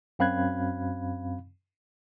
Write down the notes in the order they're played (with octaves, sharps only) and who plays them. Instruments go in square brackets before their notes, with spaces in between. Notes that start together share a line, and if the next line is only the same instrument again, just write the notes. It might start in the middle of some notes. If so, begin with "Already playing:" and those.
[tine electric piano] F#2 C4 F5 B5 F#6 G#6